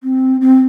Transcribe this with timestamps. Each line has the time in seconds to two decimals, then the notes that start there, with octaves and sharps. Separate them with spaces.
0.03 C4
0.41 C4